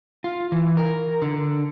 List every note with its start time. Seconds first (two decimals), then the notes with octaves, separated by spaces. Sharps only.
0.24 F4
0.52 E3
0.77 A#4
1.22 D3